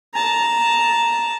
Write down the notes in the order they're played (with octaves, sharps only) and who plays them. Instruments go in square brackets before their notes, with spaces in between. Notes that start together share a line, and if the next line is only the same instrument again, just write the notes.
[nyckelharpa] A5 A#5